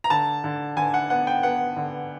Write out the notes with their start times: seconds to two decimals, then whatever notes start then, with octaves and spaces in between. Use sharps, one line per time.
0.04 A#5
0.10 D3 A5
0.44 D3
0.77 D3 G#5
0.94 F#5
1.10 B3 F#5
1.27 G5
1.43 B3 F#5
1.76 D3